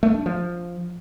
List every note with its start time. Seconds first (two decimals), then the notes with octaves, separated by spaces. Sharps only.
0.03 A3
0.14 D4
0.26 F3